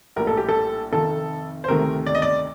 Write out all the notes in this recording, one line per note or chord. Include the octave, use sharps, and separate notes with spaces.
A#1 A2 G3 A#4
A4
G4
A4
F1 F2 D#3 A4
C5
D2 C3 D#3 A3 A#4
D5
D#5
D5